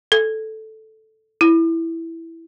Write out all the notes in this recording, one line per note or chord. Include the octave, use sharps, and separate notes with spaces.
A4
E4